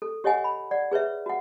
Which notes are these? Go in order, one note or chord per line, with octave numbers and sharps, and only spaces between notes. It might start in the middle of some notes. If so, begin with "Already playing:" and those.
A4
G4 C#5 D#5 F#5 G#5
B5
D5 F#5
G#4 B4 C#5 E5
F#4 F#5